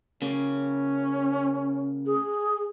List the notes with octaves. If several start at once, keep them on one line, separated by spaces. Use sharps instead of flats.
C#3 A#3 C#4
G#4